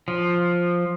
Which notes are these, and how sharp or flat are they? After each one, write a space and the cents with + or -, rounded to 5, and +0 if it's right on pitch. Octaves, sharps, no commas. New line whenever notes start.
F3 +5